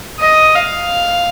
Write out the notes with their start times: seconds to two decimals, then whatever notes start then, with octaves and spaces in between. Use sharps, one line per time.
0.20 D#5
0.55 F5